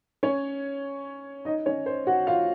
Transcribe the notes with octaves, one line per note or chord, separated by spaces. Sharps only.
C#4 C#5
D#4 D#5
C#4 C#5
C5
F#4 F#5
F4 F5